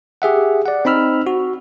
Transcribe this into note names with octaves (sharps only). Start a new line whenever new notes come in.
G4 G#4 E5 F#5
D5 F#5
C4 D#4 B5 E6 F6
F#4